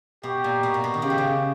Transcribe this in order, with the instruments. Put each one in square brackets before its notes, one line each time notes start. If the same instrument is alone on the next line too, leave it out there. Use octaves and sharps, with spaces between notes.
[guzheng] B2 [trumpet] G4
[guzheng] A#2
B2
A#2
B2
D#3
[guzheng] C#3 [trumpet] G4
[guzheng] B2
C#3